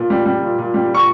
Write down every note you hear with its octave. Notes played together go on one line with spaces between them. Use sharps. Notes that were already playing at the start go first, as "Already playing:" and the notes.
Already playing: A#2
G3
G3
A#2
A#2
G3
A#2 C#6